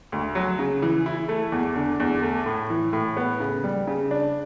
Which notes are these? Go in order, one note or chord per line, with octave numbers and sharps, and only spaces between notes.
D2
F#3
C#3
E3
E4
A3
E2
D3
E2
A3
A2
E3
A2
B3
C#3
G3
C#3
D4